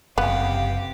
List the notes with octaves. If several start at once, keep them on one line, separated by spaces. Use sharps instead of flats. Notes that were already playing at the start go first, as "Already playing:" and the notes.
F#1 C3 B3 G4 F5